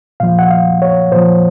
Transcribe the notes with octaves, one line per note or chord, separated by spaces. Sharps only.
A#2 F3 F5
F#5
F5
C#5
A#2 F3 C5